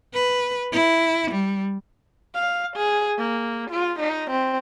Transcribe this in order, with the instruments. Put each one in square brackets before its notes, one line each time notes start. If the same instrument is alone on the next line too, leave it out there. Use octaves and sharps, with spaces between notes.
[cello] B4
E4
G3
[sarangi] F5
G#4
A#3
F4
D#4
C4